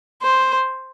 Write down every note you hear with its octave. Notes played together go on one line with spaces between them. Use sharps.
C5